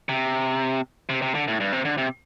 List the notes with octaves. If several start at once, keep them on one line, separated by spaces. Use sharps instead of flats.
C3
C3
C3
D3
A2
G2
C3
D3
C3